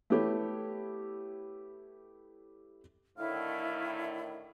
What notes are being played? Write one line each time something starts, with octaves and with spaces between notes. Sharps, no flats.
A3 B3 E4 G4 C#5
A2 D3 D#3 E4 F5